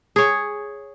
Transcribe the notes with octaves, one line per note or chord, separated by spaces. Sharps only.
G#4 C#5